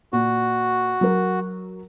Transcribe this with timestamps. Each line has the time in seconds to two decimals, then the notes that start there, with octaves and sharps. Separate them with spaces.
0.13 A#2 F#4
1.01 F#3 A#4